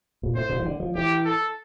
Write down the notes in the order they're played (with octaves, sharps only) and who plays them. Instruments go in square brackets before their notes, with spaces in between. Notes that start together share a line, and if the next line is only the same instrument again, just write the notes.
[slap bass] A#2
[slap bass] A2 [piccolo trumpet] C5
[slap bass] A#2
E3
D3
F3
[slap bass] E3 [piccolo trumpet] G4
[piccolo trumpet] A4